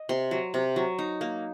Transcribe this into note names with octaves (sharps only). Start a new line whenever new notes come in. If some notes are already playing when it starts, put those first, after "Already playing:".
Already playing: D#5
C3 C6
F#3
C3
F#3
D#4
A#3